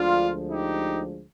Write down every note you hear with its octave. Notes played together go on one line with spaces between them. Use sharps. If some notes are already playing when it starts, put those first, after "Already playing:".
Already playing: D2 D3 F3 G#3 D4 F4
D#4 G4